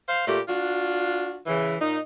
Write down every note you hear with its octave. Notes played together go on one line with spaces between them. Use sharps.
C5 F5
A#2 A3 G4
D4 F4 F#4
C#3 E3
A#2 D#4